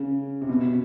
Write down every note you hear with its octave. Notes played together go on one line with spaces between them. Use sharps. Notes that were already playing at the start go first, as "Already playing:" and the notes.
Already playing: C#3
C3
B2